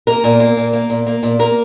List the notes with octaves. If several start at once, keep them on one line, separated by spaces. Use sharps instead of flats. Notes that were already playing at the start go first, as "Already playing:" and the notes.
A#3 A#4
A#2
A#3
A#2
A#3
A#2
A#3
A#2
A#3 A#4